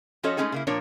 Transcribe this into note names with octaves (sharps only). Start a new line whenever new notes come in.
F3 C#4 F#4 A4 C#5 D#5
G#3 A3 C4 C#4 D#4 G#4
C#3 A#3 E4
A#2 F3 D4 A#4 C#5